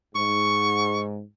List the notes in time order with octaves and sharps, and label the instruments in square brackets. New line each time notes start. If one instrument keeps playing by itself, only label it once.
[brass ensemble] G#2 [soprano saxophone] C#6